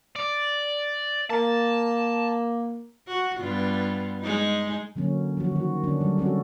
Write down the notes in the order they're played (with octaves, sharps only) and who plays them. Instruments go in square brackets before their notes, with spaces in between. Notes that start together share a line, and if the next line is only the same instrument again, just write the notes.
[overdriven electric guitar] D5
[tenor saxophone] A#3 [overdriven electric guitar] A5
[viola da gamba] F#4
G2 B3 F4
G#3 D#4
[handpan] D3 F#3 A#3 C#4
F3 F#3 F#4
D#3 F#4
D3 C#4 D4
F#3 G3
C4 C#4 F#4 A4